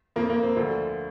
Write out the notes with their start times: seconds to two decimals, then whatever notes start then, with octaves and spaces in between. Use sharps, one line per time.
0.16 F2 F3 A#3
0.30 A#3
0.43 C4
0.56 D2 D3 F3